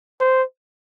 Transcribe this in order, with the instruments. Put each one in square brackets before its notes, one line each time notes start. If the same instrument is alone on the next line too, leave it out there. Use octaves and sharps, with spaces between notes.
[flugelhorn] C5